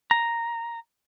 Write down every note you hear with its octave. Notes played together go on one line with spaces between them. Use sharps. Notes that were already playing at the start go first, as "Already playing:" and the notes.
A#5